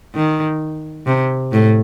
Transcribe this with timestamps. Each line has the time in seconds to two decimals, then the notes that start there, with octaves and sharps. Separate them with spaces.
0.15 D#3
1.06 C3
1.52 A2